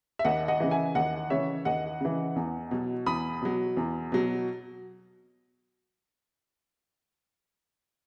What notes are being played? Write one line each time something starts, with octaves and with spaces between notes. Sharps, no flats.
E5
D#2 D#5 F#5
D#5 F#5
C#3 E3
E5 G#5
D#2 D#5 F#5
C#3 E3 C#5 E5
D#2 D#5 F#5
C#3 E3
E2
B2 F#3
E2 B5 D#6
B2 F#3
E2
B2 F#3